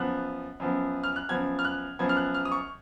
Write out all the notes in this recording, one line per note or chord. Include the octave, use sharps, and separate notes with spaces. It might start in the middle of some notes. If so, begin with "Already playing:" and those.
Already playing: F#2 F3 B3 F#6
F#2 F3 B3
F6
F#6
F#2 F3 B3 G#6
F6
F#6
F#2 F3 B3 G#6
F6
F#6
F6
D#6
C#6